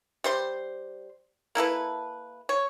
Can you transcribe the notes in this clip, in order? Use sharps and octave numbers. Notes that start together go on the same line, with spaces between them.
G3 C5 C6
A#3 E4 A4 B4
C#5